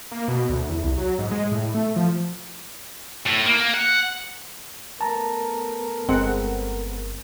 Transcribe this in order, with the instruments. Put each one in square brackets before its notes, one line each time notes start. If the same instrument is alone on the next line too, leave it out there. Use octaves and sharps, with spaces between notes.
[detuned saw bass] A#3
B2
D2
E2
C2
F#3
G#2
G#3
A2
A3
F3
[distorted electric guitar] A2
A#3
F#5
[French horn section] A3 B3 A#4 [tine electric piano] A5 A#5
[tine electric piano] G1 [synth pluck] G#3 C4 F#5